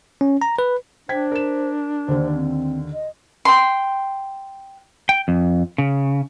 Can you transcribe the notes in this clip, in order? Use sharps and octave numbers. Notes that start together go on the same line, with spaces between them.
C#4
A#5
B4
D4 C5 G5 G#6 B6
A#4 E7
D#2 D3 C5
C4
D#5
G5 C6
G5
F2
C#3